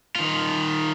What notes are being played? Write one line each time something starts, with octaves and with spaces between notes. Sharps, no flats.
D#3 F4